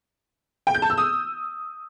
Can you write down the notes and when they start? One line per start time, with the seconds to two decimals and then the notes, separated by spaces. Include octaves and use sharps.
0.67 G5
0.75 G6
0.82 A5
0.90 E6
0.98 D#6